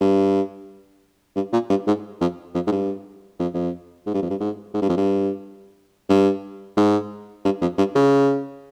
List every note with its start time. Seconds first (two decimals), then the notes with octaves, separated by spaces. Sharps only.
0.01 G2
1.36 G2
1.53 A#2
1.70 G2
1.87 G#2
2.21 F2
2.54 F2
2.67 G#2
2.71 G2
3.39 F2
3.54 F2
4.07 G#2
4.14 G2
4.22 F2
4.30 G2
4.40 G#2
4.74 G#2
4.82 G2
4.89 F2
4.97 G2
6.09 G2
6.77 G#2
7.45 G2
7.61 F2
7.78 G2
7.95 C#3